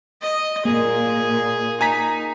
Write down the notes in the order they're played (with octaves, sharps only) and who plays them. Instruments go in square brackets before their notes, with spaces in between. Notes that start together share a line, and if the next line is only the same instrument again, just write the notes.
[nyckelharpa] D#5
[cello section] A#2 [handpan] A#3 [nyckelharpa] G#4
[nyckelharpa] D#4 [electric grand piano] G#5 A#5 B6